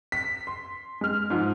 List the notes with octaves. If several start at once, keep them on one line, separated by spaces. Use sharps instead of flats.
B6
C6
G#3 F6
G#2 F3